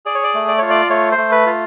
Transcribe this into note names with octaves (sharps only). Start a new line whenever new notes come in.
G#4 D5
C#5
D5
A3
D5
F4 C#5
D5
A3 C#5
C5
A3
B4
F4